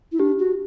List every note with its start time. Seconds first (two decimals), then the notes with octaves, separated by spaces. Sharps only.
0.12 E4
0.19 D4 G4
0.39 F#4